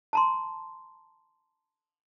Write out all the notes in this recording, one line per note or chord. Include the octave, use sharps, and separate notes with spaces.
A5 A#5 C6